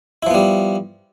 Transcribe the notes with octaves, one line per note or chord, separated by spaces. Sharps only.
F3 G3 B3 E4